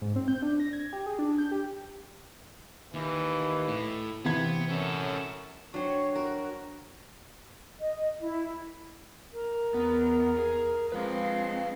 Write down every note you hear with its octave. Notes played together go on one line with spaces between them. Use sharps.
G#2
C4
G6
D4
A#6
G#6
G4
G#4
D4
G6
G4
D#2 E3
A2
C3 E3 B3 C4 G#6
F#2 C#4 A4
F#3 D4 C5 C#5 G5
F#4 A#4
D#5
E4
A#4
E2 B3
G#4
F3 G#3 C4 B4 F5